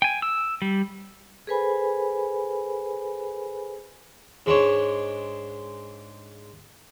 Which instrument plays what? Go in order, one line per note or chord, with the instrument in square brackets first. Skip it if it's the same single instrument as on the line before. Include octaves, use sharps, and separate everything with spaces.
[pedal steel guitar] G5 G#5
E6
G3
[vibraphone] G#4 A4 B4 C5 G#5 B5
[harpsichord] G#2 G#3 D4 C#5